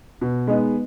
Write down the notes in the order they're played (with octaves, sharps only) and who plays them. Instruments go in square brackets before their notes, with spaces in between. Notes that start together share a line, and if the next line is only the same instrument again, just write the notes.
[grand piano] B2
G#3 B3 D#4